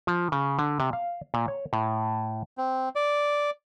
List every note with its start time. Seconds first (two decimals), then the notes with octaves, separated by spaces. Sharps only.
0.07 F3
0.32 C#3
0.59 D3
0.80 C3
0.93 F5
1.34 A#2
1.48 C#5
1.73 A2
2.58 C4
2.95 D5